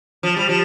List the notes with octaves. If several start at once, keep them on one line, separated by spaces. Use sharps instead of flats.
F3
G3
F3